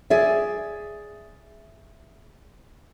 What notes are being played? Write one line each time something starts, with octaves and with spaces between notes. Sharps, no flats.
G#4 D5 E5